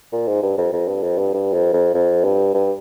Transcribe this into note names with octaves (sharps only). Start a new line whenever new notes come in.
A#2
G#2
G2
F2
F2
G2
F2
G2
G2
F2
F2
F2
G2
G2